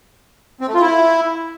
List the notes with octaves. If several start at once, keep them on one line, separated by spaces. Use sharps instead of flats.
C4
A3
F4
E4